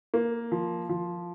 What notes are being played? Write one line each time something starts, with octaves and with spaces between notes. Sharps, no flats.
A#3
F3
F3